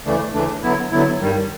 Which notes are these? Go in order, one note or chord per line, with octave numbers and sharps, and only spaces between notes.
D2 C#3 E3 A3 D4
D2 C#3 E3 A3 D4
D3 F#3 B3 E4
D3 F#3 B3 E4
G2 D#3 G3